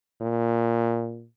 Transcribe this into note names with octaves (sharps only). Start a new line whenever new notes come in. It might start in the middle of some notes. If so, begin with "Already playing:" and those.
A#2